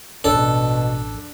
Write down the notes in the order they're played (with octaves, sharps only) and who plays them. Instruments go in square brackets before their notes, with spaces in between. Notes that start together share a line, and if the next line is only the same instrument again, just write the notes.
[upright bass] A1 F2 [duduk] B2 [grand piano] D4 [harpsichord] A4